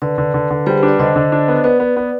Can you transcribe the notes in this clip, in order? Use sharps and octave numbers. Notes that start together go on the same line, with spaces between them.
D3 B4 D5
D3
D3
D3
G3 G#4 C5
G4 B4
D4
B4 D5
D3 C5 D#5
D3
D4
B3
B3 B4 D5
B3
B3